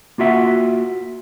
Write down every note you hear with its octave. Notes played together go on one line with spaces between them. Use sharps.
A#3 F4 F#4 E5 F#5